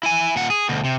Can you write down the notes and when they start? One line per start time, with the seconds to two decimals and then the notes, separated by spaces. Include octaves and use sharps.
0.03 E4 G#5
0.36 A#2 F#5
0.50 G#4
0.69 D2 B2
0.84 C3